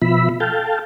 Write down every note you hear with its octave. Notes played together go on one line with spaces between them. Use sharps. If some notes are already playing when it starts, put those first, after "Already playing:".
B2 F3 E5 B5
A4 F5 G5 A5